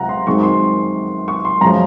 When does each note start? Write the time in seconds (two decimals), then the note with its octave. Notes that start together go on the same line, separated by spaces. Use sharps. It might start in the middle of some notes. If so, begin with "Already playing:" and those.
Already playing: C#2 C3 F#3 F5 F#5 A#5
0.09 C6
0.27 F#2 D#3 G#3 C4 C#6
0.43 C6
1.28 C#6
1.45 C6
1.61 F#2 F3 G#3 C#4 A#5